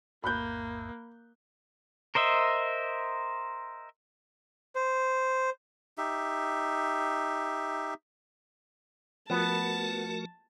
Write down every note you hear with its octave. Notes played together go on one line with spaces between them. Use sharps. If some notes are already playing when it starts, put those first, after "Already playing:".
A1 E2 G#2 A#3 B5 F#6 G6
A#4 C5 D#5 E5
C5
D#4 G4 E5
F3 A3 B3 F#4 A#4 A5